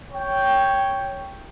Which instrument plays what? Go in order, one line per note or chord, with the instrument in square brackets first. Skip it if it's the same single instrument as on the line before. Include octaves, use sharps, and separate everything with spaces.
[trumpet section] C#5 G5